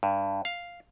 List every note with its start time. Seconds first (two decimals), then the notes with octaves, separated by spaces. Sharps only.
0.03 G2
0.45 F5